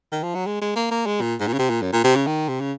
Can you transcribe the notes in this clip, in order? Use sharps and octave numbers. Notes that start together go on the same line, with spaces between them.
D#3
F3
F#3
G#3
G#3
A#3
A#3
G#3
A#2
G#2
A#2
C#3
C3
A#2
F#2
A#2
C3
C#3
D#3
C3
C#3